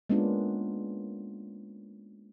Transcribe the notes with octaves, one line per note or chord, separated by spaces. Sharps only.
G#3 A#3 B3 C#4 D4 F4